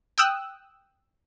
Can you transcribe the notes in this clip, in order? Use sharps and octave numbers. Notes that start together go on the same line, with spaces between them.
G5 D#6 E6 F#6